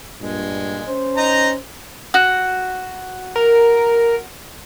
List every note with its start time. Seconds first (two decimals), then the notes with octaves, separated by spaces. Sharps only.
0.21 G2 A#2 G#3
0.88 C#4 C5
1.17 D#4 A#5
2.14 F#4
3.36 A#4